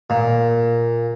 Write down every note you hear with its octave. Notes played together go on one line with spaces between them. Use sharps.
A#2